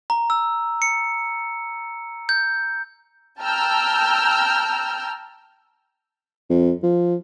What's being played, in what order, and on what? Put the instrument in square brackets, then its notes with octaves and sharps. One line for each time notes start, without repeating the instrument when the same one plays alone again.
[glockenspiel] A#5
E6
C#7
G6
[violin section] G5 A5 A#5 E6 F6 G6
[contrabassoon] F2
F3